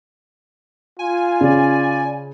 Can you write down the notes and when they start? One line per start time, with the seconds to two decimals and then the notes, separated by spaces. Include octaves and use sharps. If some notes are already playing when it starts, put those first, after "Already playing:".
0.99 F4 G#5
1.41 C#3 D5